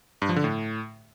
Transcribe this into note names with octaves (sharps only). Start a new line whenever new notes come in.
G2
F3
D3
A2